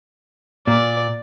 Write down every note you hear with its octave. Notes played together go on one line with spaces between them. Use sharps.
A#2 D5